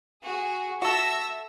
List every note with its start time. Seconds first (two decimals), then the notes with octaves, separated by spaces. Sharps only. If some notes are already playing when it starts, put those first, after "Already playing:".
0.24 F#4 G#4
0.82 F#4 A4 E5 E6 A#6